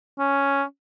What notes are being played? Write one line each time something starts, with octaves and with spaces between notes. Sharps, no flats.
C#4